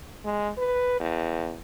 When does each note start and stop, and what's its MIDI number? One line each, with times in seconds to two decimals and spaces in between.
0.24 0.50 56
0.58 0.97 71
1.00 1.55 40